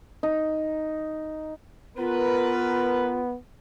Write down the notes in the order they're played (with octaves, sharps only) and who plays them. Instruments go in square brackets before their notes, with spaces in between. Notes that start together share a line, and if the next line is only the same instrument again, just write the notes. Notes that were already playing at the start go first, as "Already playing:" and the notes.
[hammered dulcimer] D#4
[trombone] B3 [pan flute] F4 [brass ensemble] A#4 B4